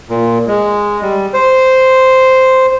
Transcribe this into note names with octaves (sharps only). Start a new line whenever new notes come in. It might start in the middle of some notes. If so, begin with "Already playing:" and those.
A#2
G#3
G3
C5